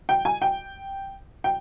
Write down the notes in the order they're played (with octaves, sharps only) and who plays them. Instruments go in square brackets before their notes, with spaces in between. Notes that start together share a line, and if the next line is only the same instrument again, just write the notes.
[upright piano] G5
G#5
G5
G5